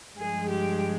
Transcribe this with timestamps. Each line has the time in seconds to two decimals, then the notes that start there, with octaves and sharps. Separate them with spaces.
0.17 G2 F3 G#3 G#4
0.49 G4